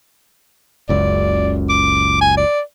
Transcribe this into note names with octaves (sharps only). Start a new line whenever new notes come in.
F#1 C#2 F#2 D5
D6
G#5
D5